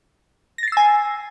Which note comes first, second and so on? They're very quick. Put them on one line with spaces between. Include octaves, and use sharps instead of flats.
A#6 A6 C7 E6 G#5